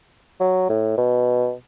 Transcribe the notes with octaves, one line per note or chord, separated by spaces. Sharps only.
F#3
A2
B2